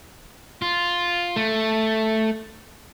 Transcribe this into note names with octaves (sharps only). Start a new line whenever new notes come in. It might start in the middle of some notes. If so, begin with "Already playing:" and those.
F4
A3